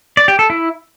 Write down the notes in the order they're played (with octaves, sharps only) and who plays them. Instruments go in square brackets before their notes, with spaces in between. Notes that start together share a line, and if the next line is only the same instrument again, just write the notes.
[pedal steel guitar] D5
G4
A4
E4